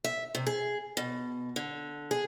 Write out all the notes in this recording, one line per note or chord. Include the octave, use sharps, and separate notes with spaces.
E5
C3
G#4
B2
D3
G#4